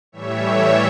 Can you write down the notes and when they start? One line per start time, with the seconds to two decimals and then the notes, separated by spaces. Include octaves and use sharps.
0.12 A2 E3 G3 C#5 E5